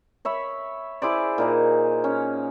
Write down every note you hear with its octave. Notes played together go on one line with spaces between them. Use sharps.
C#5 E5 B5
E4 G#4 C5 D5
A#2 D#4 G#4
C#4